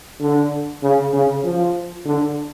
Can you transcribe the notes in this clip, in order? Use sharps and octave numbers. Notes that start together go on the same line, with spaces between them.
D3
C#3
C#3
F3
D3